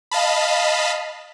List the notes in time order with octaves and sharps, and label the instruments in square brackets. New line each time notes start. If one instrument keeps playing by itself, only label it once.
[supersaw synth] D#5 F5 A5 B5